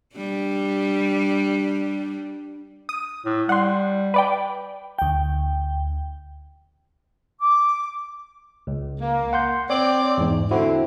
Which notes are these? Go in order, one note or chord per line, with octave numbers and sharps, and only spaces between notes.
G3 D4
D#6
A2
G3 F#5 C6
B4 D5 G5
D2 G5
D6
C#2
A#3
F#5 C6 G6
C4 C#5 D5
E2 G#2
D3 C4 E4 F#4